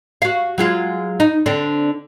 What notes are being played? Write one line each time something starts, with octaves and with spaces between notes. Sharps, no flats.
F#4 F5
F#3 G#3 F4
D#4
D3 C4 D4